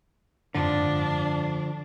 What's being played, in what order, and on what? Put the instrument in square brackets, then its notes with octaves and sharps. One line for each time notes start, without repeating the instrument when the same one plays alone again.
[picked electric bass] F#1 F2 G#2 [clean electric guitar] D3 F3 [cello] D4